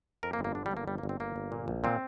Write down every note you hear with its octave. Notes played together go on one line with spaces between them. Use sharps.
F2 A#4
A#3
G1
A#3
D3 D4
G3
G1
A#3
G1 G3
A#3
G1
C4
G1 A#3
G1
A#2
A#1
A#2 C4